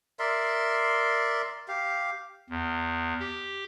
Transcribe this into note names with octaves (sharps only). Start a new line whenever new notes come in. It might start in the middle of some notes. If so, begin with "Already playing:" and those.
A#4 D5 E5 C6
G4 F5
E2
G4